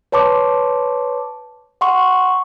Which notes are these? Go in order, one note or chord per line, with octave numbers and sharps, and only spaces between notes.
B4 C#5 A5 C6 D6
F#5 C6 C#6